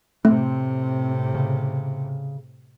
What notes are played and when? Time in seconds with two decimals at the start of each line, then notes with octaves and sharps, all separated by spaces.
0.25 A2 C3 A3 C4
1.35 C#3